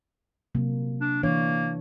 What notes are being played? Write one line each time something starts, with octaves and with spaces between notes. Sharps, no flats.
C3 F#3 A#3
D4
E3 A#3 D4 C#5